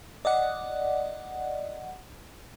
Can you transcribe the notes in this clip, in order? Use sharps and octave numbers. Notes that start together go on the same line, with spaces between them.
D5 D#5 F#5